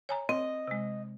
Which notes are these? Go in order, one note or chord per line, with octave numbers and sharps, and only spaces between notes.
C#5 G#5 A#5
C4 D#5
C3 G#3